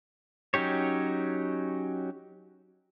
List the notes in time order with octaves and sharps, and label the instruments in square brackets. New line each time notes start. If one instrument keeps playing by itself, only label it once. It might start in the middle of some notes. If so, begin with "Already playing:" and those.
[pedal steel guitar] F#3 C#4 D#4 G4 C#5